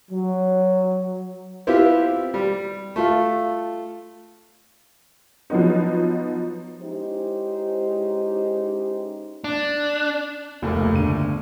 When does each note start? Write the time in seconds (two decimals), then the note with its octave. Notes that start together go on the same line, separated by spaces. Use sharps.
0.11 F#3
1.67 B3 C4 E4 F4 G4
2.34 G3
2.96 A3 F4
5.50 F3 F#3 B3 D#4
6.81 G#3 C#4 D#4 E4 G4 C5
9.44 D4
10.62 F1 C#2 A3 A#3
10.94 G1 D3 D#7